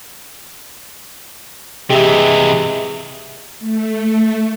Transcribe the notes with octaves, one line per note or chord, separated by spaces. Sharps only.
C3 E3 G#3 G4 E5
A3